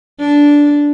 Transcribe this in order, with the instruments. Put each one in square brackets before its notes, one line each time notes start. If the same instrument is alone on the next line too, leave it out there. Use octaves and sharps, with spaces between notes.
[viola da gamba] D4